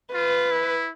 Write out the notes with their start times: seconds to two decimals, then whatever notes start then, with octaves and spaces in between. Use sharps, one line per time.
0.14 F4 B4
0.51 E4